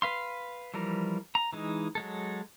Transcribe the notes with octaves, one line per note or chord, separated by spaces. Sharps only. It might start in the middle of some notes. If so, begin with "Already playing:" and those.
B4 F5 C6
E3 F3 G3 A#4
A#5
E3 G#3 D#4
F#3 G#3 A4